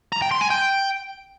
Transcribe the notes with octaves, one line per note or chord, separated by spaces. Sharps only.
A#5
G5
C6
G#5
G5